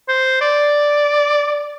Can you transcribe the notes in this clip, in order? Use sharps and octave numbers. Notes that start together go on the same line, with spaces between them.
C5
D5